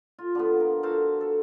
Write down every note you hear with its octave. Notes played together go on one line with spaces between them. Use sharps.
F4
D3 F3 B3
A#4
F#4 A4 C5 F5
A4